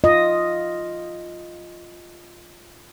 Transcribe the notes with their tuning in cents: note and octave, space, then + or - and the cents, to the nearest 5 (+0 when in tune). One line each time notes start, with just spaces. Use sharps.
F4 +0 D#5 +0